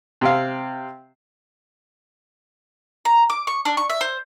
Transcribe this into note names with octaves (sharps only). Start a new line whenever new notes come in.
C3 C4 F5
A#5
D6
C#6
D4
C#6
E5
C5